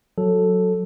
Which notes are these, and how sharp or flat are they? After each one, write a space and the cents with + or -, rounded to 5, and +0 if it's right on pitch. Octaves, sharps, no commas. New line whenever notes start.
F#3 -10 A4 +0